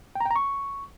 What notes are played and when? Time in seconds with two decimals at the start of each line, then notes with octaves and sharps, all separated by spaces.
0.15 G5
0.20 A#5
0.26 G5
0.31 A#5
0.36 C#6